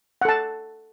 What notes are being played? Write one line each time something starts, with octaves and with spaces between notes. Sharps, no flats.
A4 F#5 A5